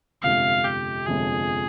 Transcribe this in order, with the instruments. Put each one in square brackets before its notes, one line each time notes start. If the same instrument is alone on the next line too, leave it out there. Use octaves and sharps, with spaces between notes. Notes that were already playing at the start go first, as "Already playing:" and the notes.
[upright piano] G1 F2 C3 F3 G#3 [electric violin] F5
[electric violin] G4
[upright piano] G1 F2 C3 F3 G#3 [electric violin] G#4